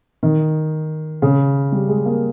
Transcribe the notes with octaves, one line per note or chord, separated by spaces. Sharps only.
D#3
C#3
G3
G#3
A#3